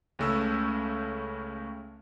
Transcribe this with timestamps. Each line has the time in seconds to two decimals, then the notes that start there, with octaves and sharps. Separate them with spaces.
0.19 C#2 C#3 A3 C#4 E6